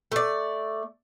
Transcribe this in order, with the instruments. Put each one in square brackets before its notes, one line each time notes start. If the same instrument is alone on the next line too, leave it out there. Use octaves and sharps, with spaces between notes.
[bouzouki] A3 D5